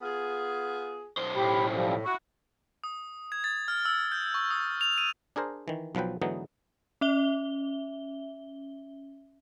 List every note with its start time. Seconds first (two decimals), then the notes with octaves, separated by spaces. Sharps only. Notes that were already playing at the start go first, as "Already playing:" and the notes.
0.02 B3 F4 G#4
1.17 B1 C5
1.36 A2 G4 B5
1.74 F3 G3
2.05 E4 F#4 C#6
2.84 D#6
3.32 G#6
3.44 A6
3.68 F6
3.85 E6
4.12 G6
4.34 C#6
4.51 D#6
4.81 F7
4.98 D#7
5.36 D4 G#4 A#4 C5
5.68 D#3 E3
5.95 B1 F3 F#3 B4 G5
6.22 G#2 D3 E3 F#3 B3 D#4
7.01 C#4 E5 G7